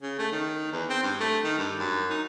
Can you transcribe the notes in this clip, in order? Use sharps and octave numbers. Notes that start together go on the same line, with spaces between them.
C#3
A3
D#3
E2
C4
G2
A3
D#3
G2
F#2
D#4